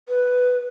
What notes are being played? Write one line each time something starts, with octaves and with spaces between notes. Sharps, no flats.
B4